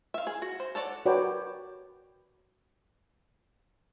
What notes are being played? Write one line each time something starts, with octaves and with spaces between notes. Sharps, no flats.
E5 F5
G#4
F#4
C5
A4 C#5 D5 F#5
F#4 A#4 B4 C#5 D5 G5